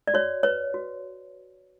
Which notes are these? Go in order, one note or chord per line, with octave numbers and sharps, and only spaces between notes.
D5
F#4 C#5
B4 C#5
F#4